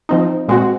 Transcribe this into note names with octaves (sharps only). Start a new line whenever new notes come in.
F3 C4 D#4
A#2 G#3 C4 F#4